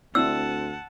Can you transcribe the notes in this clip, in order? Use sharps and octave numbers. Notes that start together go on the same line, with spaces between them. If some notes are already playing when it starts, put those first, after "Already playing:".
D2 C4 D4 E4 F#5 A5 E6